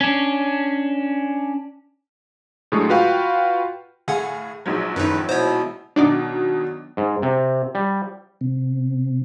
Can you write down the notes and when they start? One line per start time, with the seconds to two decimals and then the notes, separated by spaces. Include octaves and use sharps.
0.01 C#4 D4
2.72 A2 D3 F#3 G#3 A3
2.89 F4 F#4 B4 F5 G5
4.08 A2 D3 G#4 F5 F#5
4.66 A#1 G#2 F#3
4.96 F#2 A2 D#3 D#4 B4
5.29 B2 E3 B3 C5 C#5
5.96 B2 D#3 F#3 D4 D#4 D5
6.97 G#2
7.22 C3
7.75 G3
8.41 C3